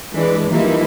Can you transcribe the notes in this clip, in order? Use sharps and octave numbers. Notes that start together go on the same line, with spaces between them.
E3 G#3 D4 B4 D5
E3 F3 G3 A#3 D#4 E4